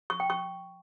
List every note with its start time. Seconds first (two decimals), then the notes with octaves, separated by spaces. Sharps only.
0.10 C#6
0.20 G5
0.30 C#6